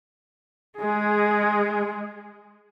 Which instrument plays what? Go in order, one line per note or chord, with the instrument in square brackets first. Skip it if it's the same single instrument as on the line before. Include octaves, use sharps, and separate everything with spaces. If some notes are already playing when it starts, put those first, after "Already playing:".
[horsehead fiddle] G#3 G#4